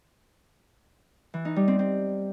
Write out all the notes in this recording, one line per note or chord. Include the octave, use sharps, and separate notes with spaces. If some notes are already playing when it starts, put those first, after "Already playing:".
E3
D#4
G3
C4
C4